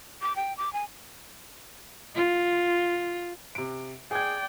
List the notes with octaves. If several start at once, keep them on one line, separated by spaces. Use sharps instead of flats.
D6
G5
D6
G#5
F4
C3 D7
G#4 D5 G5 G#6